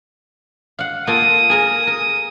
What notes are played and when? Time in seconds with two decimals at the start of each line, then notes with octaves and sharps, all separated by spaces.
0.79 F5 F#5
1.07 A#3 F4 A4 D#6
1.50 G#4 A#4 A#5
1.87 A#4